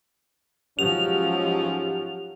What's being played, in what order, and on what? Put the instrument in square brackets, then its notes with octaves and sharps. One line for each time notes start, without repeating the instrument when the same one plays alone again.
[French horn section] G#2 C#4 [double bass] F3 F#3 [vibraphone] G4 [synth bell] F7